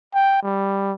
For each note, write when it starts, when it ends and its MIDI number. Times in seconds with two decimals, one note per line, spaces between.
0.14 0.39 79
0.43 0.93 55